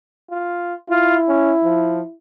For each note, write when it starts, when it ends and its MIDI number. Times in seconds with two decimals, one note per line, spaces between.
0.31 0.74 65
0.90 2.13 64
0.90 1.16 65
1.28 1.53 61
1.64 2.01 53